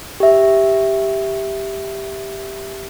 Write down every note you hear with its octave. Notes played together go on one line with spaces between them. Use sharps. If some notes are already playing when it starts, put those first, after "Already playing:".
G4 E5